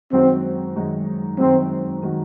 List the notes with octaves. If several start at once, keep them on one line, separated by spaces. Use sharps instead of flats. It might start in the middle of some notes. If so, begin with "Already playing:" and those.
F#2 D#3 G#3 C4 D#4 F#4
F#2 D#3 G#3 D#4 F#4
F#2 D#3 G#3 C4 D#4 F#4
D#3 G#3 D#4 F#4